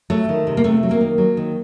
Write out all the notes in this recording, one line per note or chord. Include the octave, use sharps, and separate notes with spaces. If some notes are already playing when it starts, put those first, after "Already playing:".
F#3 A3
D#3
C3
A#3
C3 A3
F#3
A#3
D#3
F#3
D#3